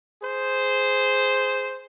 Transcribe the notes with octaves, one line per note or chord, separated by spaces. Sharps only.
G#4 C5